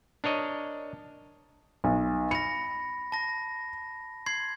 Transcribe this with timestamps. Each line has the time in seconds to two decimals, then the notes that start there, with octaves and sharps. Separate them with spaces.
0.24 D4 A#4 C#5 D#5
1.84 B1
2.31 B5 A#6 C#7
3.12 A5 A#6
4.26 C6 G#6 C7